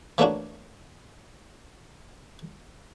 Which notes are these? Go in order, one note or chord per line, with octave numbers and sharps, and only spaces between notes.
E3 A3 A#3 C#4 D4 F#4